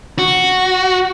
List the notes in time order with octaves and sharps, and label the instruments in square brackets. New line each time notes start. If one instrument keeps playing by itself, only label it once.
[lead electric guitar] F#4